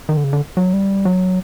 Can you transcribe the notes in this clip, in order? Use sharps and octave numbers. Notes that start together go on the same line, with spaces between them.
D#3
D3
C#3
D3
F#3
G3
F#3